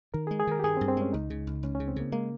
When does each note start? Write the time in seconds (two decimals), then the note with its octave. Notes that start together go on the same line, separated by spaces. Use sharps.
0.14 D#3 A#4
0.27 G#4
0.31 G#3
0.39 G#4
0.47 D#3 A#4
0.59 G4
0.64 G2 G#4
0.77 C4
0.81 G2
0.88 C4
0.97 G#3 C#4
1.13 C#2 D#4
1.30 C#3
1.47 C#2
1.63 C#2 C#4
1.75 C#3 C#4
1.88 C4
1.96 C#3 A#3
2.12 G#3 A#3